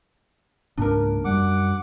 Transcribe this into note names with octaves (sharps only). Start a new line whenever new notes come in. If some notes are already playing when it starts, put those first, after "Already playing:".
C#2 G#2 A#3 D4 A#4
F#2 G3 F#5 D6